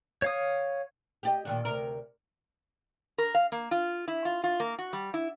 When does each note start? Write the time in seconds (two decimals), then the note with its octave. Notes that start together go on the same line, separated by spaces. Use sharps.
0.22 C#5 F5 D#6
1.23 G4 D5 D#5
1.45 A#2 D#3 D4
1.65 D2 C3 A#4
3.18 A#4
3.35 F5
3.52 A#3
3.71 F4
4.08 E4
4.25 F4
4.44 F4
4.60 A#3
4.78 F#4
4.93 G3
5.14 E4